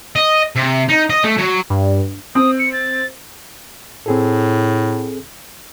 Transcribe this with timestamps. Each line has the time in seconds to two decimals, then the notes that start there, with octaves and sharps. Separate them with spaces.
0.16 D#5
0.56 C3
0.89 D#4
1.10 D#5
1.24 A3
1.38 F#3
1.70 G2
2.35 C4 D#6
2.59 C#7
2.73 A6
4.06 A2 C4 G#4 A4